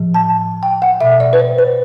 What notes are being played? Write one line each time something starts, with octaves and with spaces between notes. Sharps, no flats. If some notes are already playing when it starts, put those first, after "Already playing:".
Already playing: A2 F3
A5
G5
F#5
B2 E5
D5
B4
C5
B4